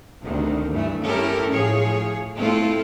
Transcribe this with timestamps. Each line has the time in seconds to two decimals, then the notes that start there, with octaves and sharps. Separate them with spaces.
0.23 D2 C3 D#3
0.71 G2 E3 A3
1.02 C#4 E4 G4 A4 A#4
1.49 A2 F3 G#4 C#5
2.36 A3 C4 E4 F4 A4